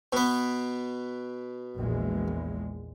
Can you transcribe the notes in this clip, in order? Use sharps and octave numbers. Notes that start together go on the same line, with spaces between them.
B2 B3
A#1 E2 G#3